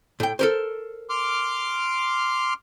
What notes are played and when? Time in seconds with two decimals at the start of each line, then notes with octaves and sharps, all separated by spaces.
0.20 A2 G5
0.39 A4 A#4 C5
1.10 C6 D6 F6